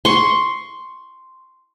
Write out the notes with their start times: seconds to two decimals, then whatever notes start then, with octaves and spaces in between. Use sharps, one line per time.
0.05 C6 C#6